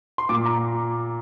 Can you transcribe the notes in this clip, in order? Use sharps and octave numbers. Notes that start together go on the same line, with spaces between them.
C6
A#2 D6
A#5